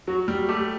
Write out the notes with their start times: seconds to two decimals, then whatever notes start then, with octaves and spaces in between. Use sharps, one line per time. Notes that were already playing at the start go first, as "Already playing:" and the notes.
0.07 F#3 F#4
0.28 G3
0.48 A3 G4